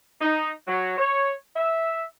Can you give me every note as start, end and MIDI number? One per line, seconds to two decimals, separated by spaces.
0.21 0.49 63
0.67 0.95 54
0.98 1.33 73
1.56 2.04 76